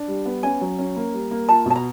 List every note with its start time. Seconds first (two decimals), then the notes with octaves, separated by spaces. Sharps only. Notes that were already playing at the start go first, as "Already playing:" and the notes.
Already playing: D4
0.08 G3
0.26 B3
0.43 C#4 G#5
0.61 F#3
0.79 C#4
0.96 A#3
1.14 G3
1.31 A#3
1.49 F4 A5
1.66 B2 A5
1.76 A#5